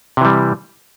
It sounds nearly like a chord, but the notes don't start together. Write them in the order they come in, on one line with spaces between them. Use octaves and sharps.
C3 E3 G3